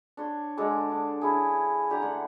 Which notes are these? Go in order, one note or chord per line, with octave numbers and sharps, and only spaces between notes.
D4 C#5 C6
D3 G#3 A4 D6
D4 D6
C#4 E4 G#4
D3 G4 A#5
D3 A3 F#5